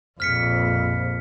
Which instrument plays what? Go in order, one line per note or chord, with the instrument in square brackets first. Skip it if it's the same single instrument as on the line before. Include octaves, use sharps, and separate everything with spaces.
[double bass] A#1 F2 [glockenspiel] F6 B6 C#7